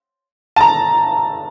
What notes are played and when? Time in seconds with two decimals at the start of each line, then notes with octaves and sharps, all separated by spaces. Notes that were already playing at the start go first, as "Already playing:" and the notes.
0.56 A5
0.61 A#5